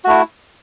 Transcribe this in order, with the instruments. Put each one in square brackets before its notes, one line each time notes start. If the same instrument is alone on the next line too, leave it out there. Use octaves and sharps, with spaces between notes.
[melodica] F#4
A3
E4